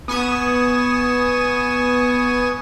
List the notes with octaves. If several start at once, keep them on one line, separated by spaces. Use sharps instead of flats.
B3 G#5 C#6 D#6 E7